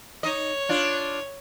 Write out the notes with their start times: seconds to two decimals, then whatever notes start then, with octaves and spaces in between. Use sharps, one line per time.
0.23 D#4 C#5 D#5
0.69 D4 F4